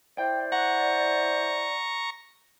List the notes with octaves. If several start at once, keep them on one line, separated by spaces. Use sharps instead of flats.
E4 C5 D5 G5
F#5 A#5 C#6